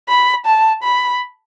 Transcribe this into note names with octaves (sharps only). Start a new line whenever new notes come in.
B5
A5
B5